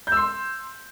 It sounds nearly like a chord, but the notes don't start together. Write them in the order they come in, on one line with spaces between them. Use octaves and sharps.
G6 E6 C6